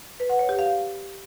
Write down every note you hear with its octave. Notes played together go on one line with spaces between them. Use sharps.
B4
F#5
C#5
G4
F5